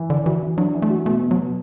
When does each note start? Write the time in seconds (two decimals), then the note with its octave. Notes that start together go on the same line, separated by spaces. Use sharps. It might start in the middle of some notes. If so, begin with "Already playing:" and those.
Already playing: E3
0.10 D3 D5
0.26 E3 F#4
0.42 E3
0.57 F#3 D4
0.74 E3
0.82 A3
0.90 F#4
1.06 B2 A3
1.22 B2
1.31 F#3
1.38 B2